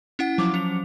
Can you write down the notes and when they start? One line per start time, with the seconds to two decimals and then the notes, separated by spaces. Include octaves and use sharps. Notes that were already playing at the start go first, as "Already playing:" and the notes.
0.19 C#4 E4 F#5
0.38 F3 F#3 D6
0.54 C#4 C#7 F7